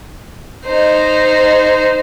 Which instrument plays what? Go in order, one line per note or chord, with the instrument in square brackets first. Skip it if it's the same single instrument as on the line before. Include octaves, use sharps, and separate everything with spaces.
[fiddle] D#4 C5